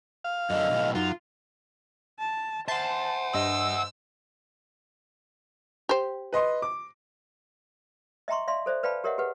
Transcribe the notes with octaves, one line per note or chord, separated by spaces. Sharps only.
F5
F#2 D3 D#5
B1 A2
F#2 D#4 F4
A5
C5 E5 F#5 A5 C6
G2 D#5 E6
G4 C5
B4 D#5 C6
D6
D#5 E5 G5 A#5 C6 C#6
D5 E5 F5 C6
A4 C5 D5 E5
B4 D5 F5 G5 A5 B5
G4 A#4 C#5 D#5 E5 F#5
G4 G#4 B4 F#5